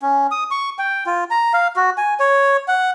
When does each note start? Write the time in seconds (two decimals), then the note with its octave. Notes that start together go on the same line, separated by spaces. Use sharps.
0.02 C#4
0.31 D#6
0.51 C#6
0.79 G5
1.06 F4
1.30 A#5
1.54 F5
1.76 F#4
1.98 G#5
2.20 C#5
2.68 F#5